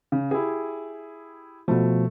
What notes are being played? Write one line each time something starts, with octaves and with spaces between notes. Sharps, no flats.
C#3
E4 G4 G#4
B2 F3 A3